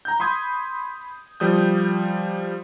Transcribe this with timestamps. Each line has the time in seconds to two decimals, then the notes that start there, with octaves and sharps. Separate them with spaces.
0.05 A#5 G6
0.20 B5 C6 D#6 G#6
1.40 F3 G3 D#6 G6